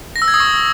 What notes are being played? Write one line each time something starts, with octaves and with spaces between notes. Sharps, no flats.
A#6
E6
G#6
D#6
C#6